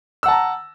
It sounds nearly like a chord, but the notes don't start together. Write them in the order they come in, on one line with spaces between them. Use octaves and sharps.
E6 F#5 A5 A#5